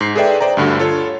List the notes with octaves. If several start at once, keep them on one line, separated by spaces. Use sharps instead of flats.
G#2 C7
G#4 A4 B4 D5 E5 G5
C5 D5 G5 A#5
D2 G2 D3 F#4
F4 A4 C#5